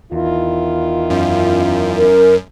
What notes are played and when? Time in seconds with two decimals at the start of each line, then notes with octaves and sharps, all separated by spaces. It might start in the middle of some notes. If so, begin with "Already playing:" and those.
0.12 E2 D#3 E4 F4
1.10 F#2
1.96 A#4